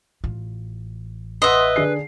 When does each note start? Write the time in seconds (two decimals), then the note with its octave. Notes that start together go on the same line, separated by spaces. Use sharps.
0.24 A1 F4
1.42 B4 D#5 E5 F#5 C6 D#6
1.76 D3 G#4 C7